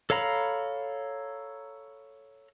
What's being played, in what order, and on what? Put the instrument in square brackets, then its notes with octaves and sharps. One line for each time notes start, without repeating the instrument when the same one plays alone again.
[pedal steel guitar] A4 C#5 F5 A#5 B5